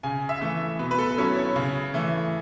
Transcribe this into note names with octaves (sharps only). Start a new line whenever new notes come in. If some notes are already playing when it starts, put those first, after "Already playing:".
C#3 G#5
E5
E3 A3
B2 B4
B4
A4
F#3 C#4 E4 A4
C#5
C#3
E3 A3